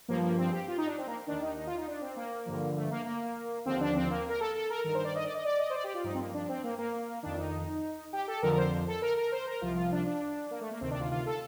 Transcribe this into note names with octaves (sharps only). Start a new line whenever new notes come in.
G2 F3 A#3
A#3
C4
G4
F4
D#4
D4
C4
A#3
D#2 D#3 D4
D#4
D#4
F4
D#4
D4
C4
A#3
G2 D3 F3
A3
A#3
A#3
D#2 D3 F3 C4
D4
C4
A#3
A#4
A4
A4
A#4
G2 D#3 A#4
C5
D5
D#5
D5
D#5
D5
D#5
C5
D5
G4
F4
G2 F3 D#4
C4
A#3
D4
C4
A#3
A#3
F2 D#3 D4
D#4
G4
A4
F2 D3 F3 A#4
A#4
C5
A4
A#4
A#4
C5
A#4
C2 C3 F3 F4
F4
D4
D4
A#3
A3
A#3
D2 C3 D#3 C4
D4
F4
F4
A4